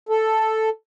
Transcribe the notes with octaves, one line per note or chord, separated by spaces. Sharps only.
A4